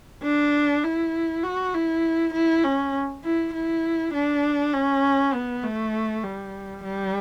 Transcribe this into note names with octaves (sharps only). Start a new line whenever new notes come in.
D4
E4
F#4
E4
E4
C#4
E4
E4
D4
C#4
B3
A3
G3
G3